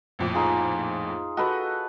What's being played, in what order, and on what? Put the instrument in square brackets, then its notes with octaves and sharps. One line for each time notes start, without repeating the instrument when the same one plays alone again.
[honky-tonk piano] A#1 F2 A2
[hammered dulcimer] D#4 F4 G#4
[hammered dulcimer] F#4 A4 B4 [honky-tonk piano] D#5